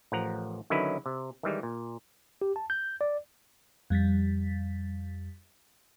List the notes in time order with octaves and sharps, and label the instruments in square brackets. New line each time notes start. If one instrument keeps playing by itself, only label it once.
[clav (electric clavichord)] A1 F3 A#4 F#5 A#5
D3 D#3 F#3 C#4 E4 B4
C3
D#3 E3 G3 G#3
A#2
[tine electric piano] G4
A5
G6
D5
[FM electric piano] F2 G3 A6 B6